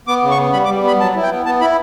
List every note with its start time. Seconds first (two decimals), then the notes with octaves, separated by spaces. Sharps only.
0.07 B3 D6
0.23 C#3
0.31 C#6
0.37 B3
0.53 G3 B5
0.65 D6
0.69 G3
0.84 B3 B5
1.00 F#3 A5
1.15 E4
1.23 G5
1.31 B3
1.46 B3 A5
1.61 E4 B5